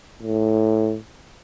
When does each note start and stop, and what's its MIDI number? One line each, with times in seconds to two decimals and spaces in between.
0.22 0.98 45